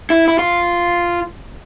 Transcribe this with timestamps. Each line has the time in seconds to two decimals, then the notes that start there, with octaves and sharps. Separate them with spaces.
0.10 E4
0.28 E4
0.39 F4